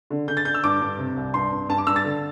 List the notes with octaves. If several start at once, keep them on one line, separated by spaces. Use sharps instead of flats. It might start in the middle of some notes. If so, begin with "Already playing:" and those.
D3
D3 G6
A6
D3 G6
E6
G2 D6
G2
C3
C2
G2 C6
G2
G2 A5
D6
G2 E6
A6
D3